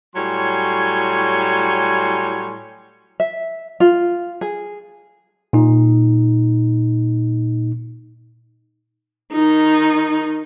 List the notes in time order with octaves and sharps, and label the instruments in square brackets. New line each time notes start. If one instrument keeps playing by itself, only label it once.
[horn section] A2 F#3 G3 C#5 G#5 C6
[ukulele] E5
F4
G#4
[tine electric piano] A#2 D#4
[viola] D#3 D#4